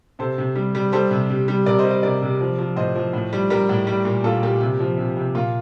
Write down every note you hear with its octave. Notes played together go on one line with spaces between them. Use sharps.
C3 A4 C5
C3
G3
G3
G3 A4 C5
C3
C3
G3
C3 A#4 D5
C5 D#5
G3
C5 D#5
C3 A#4 D5
C3
F3
F3
A2 C5 D#5
F3
A2
G3
G3 G4 A#4
A2
G3
A#2
A#2 F4 A4
A#2 G4
C3 G4
F3
C3
C3
A#2 F4